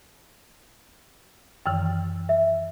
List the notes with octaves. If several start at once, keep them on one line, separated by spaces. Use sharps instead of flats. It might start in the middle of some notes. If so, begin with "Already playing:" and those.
F#2 D#3 E3
E5